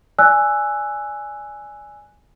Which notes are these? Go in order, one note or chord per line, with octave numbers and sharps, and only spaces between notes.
D5 G#5 E6 F#6